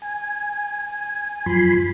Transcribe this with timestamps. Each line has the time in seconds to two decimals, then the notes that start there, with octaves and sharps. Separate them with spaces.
0.02 G#5
1.46 F#2 F3 G#5 B5 C6